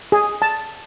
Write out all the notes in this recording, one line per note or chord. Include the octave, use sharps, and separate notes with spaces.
G#4
A5